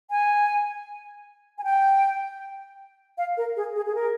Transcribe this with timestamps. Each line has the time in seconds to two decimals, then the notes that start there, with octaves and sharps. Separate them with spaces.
0.10 G#5
1.58 G#5
1.64 G5
3.18 F5
3.37 A#4
3.56 G#4
3.75 G#4
3.86 G#4
3.95 A#4